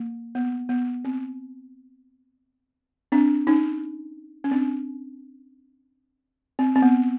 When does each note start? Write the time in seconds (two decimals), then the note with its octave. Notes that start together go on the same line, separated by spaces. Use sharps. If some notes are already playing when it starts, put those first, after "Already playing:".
Already playing: A#3
0.35 B3
0.69 B3
1.05 C4
3.12 C4 D4
3.47 C#4 D#4
4.44 C#4
4.51 C4 D4
6.59 C4
6.76 C4
6.82 B3